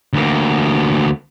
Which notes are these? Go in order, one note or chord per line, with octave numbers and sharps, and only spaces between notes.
D2 A#3